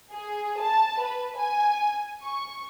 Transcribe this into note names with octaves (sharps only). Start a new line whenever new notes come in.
G#4
A5
B4
G#5
C#6